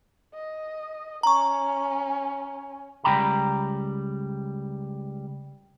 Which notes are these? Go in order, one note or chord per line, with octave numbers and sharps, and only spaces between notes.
D#5
C#4 A#5 C#6
C#2 G2 G3 G5 A#5 B5